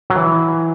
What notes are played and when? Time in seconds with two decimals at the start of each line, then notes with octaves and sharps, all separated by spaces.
0.10 F#3
0.16 E3